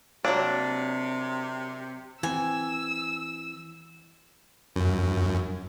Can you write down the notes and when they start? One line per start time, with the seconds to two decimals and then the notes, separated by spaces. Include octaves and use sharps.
0.25 C3 F#3 A#3 D4
2.23 E3 C4 G#5 E6
4.76 F#2